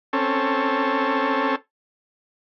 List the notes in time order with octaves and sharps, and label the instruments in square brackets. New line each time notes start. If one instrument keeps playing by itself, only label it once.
[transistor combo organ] C4 C#4 A4